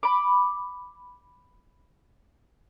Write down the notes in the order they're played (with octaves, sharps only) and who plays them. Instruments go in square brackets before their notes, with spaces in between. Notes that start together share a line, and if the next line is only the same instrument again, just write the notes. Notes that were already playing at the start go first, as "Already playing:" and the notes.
[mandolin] B5 D6